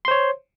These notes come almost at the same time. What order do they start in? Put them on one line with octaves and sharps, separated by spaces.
C6 C5 C#5